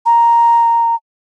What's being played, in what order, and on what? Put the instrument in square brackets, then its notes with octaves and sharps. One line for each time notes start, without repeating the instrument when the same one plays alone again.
[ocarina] A#5